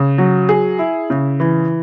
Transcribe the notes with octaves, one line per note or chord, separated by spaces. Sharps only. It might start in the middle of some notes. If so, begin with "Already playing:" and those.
Already playing: C#3
F#3
G#4
E4
C#3
E3